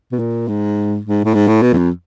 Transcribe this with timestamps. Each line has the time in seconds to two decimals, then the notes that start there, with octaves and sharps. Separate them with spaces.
0.12 B2
0.19 A#2
0.48 G#2
1.05 G#2
1.25 A2
1.34 G#2
1.48 A2
1.62 B2
1.73 E2
1.77 F2